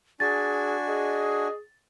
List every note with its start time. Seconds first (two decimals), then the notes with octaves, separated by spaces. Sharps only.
0.20 D4 F#4 G#4 G#5 A6
0.87 G#4 D#5